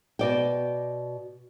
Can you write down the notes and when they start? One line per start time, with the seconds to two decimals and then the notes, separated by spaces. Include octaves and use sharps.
0.19 B2 D5 G5